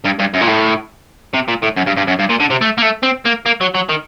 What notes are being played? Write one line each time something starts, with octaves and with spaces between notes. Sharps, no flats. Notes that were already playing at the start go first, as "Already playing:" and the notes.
G2
G2
F#2
A#2
A2
C3
A#2
A2
F#2
G2
G2
F#2
G2
A#2
D3
C3
A3
A#3
A3
C4
A#3
A#3
F#3
F#3
D#3